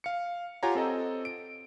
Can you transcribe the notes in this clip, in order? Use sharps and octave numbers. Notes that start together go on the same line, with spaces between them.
F5 C#7
F4 G4 C#5 F#5 G#5 A#5
C4 A4 D#5
D7